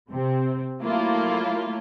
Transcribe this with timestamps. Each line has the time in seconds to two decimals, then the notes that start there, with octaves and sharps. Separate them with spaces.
0.11 C3 C4
0.82 F#3 A3 A#3 E4 F4